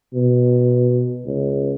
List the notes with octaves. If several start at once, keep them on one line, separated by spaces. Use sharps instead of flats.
B2
C#2